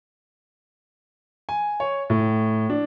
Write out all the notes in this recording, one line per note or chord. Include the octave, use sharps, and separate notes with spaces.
G#5
C#5
A2
D4